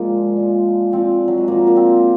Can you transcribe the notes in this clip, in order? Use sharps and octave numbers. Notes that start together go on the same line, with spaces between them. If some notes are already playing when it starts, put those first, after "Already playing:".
Already playing: A#2 F3 G#3 A#3
A#2 F3
A#2 F3 C4
F#3
G#3
A#2 F3 A#3
A#3
C4